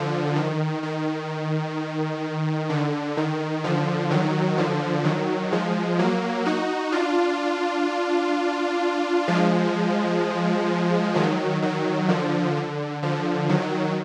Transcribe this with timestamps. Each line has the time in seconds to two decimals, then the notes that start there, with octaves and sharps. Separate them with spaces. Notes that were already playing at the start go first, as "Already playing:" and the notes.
Already playing: D3 F3
0.36 D#3
0.83 D#3
2.69 D3
3.17 D#3
3.64 D3 F3
4.10 D#3 F#3
4.58 D3 F3
5.04 D#3 F#3
5.52 F3 G#3
5.99 F#3 A#3
6.45 D#4 F#4
6.92 D4 F4
9.28 F3 G#3
11.15 D#3 F#3
11.62 D#3 F#3
12.09 D3 F3
12.56 D3
13.02 D3 F3
13.49 D#3 F#3